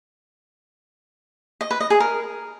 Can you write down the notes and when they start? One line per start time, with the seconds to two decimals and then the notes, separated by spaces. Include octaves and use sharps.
1.61 D#5
1.71 B4
1.80 D#5
1.90 G#4
2.00 A#4